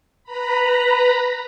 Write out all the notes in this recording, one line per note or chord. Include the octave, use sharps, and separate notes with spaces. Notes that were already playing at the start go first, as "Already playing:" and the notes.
B4 A#5 B5